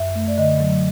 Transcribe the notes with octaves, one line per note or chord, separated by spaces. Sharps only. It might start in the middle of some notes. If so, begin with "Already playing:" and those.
Already playing: F#2 E5
A3
D5
D3 D#5
F#3